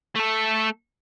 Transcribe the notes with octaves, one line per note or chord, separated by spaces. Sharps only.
A3 A4